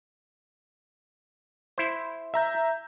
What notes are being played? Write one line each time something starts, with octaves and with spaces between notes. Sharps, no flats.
E4 C5
E5 A#5 G6